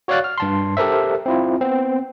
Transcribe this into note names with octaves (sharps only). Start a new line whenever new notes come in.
F#4 C#5 D5 F5 F#6 A6
F6
G2 A5 C6
G4 A4 A#4 C5 E5
C4 E4 F4
B3 C4